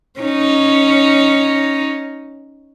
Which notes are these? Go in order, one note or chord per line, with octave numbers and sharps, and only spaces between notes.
C#4 D#4